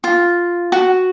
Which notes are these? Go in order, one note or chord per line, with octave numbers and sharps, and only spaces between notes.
F4
F#4